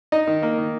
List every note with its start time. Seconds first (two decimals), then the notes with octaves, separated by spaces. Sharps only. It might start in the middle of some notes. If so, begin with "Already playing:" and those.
0.12 D#4 D#5
0.27 D#3
0.42 A#3
0.58 D#3